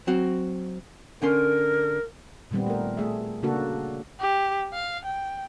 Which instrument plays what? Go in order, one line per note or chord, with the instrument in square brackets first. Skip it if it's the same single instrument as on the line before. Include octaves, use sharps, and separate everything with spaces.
[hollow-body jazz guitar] F#3 C4 F#4
[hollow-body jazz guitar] D3 C#4 C6 [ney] A#4
[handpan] A#2 D#3 G3 B3 C4
A3 A#4
A3 G#4 E5
C#3 A#3 D4 F#4 A4
[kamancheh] G4
F5
G5